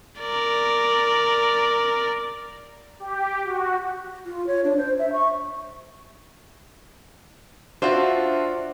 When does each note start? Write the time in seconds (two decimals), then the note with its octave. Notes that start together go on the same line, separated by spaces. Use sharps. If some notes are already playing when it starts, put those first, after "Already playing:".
0.21 A#4 D5
3.00 G4
3.44 F#4
4.26 F4
4.47 C#5
4.64 D4
4.77 C5
4.99 E5
5.13 C#6
7.82 D4 F4 F#4 C5 E5